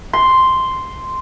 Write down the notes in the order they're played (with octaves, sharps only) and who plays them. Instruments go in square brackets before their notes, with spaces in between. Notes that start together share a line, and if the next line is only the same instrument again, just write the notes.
[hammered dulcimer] C6